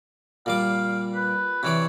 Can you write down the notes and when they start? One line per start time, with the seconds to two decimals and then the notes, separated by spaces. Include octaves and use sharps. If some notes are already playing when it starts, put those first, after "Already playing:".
0.46 A#2 G3 F5 D6
1.14 B4
1.63 C3 E3 C#5 D5